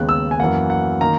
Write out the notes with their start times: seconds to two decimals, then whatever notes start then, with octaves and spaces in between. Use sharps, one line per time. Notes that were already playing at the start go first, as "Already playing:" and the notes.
Already playing: D#2 C#3 G#3 B3 F#6
0.09 E6
0.31 G#5
0.40 F#2 E3 A#3 F#5
0.70 F#5
1.01 D#3 A#3 A#5